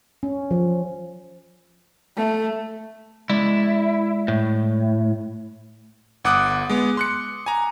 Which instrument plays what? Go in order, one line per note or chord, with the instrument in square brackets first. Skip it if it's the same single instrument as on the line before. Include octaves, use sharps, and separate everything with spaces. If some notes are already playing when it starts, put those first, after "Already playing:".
[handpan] C#4
F3
[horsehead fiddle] A3
[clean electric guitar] G#3 D5 E5 [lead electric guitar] E4
[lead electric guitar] A2
[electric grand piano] G1 F#5 D6 D#6 F#6
G#3 B3
C6 F#6 C#7
G#5 A#5